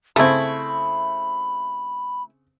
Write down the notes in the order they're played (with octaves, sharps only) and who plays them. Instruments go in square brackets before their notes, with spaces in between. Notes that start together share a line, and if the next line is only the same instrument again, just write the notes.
[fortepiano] C#3 C4 [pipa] A3 E4 [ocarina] B5